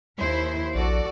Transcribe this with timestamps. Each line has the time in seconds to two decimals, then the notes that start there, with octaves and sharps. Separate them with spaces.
0.19 D#2 E4 C5
0.75 A#1 F#4 A4 D5